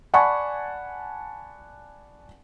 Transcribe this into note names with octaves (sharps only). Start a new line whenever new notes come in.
D5 F#5 G#5 A5 B5 C#6